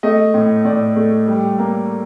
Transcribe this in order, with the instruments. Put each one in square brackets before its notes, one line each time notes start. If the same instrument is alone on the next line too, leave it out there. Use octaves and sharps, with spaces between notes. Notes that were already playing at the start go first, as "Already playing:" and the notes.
[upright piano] A3 D#5
A2
A2 D5
A3
G3
A#3